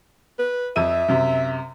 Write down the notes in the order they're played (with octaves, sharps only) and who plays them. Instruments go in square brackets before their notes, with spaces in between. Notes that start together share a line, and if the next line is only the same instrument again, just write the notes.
[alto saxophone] B4
[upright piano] F2 E6 D#7 [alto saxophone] E5
[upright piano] F#2 C3